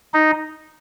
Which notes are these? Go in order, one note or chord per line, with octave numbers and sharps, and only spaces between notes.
D#4